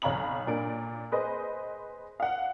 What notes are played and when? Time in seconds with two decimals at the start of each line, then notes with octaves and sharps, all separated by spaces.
0.02 B1 C#5 F5 A#5 B5 F#7
0.47 A#2 D4 D7
1.12 G#4 B4 C5 D#5
2.20 F5 F#5